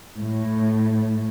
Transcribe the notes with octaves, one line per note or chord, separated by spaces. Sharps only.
A2